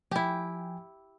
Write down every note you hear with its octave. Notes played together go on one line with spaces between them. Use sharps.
F3 E4 G4 G5 G#5